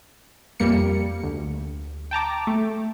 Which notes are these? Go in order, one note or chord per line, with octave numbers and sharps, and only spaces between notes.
F2 G3 A#3 C#7
D2
G5 A5 A#5 D6
A3